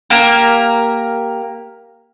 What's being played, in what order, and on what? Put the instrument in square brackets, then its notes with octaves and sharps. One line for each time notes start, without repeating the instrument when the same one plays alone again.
[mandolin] A#3 G4 A#4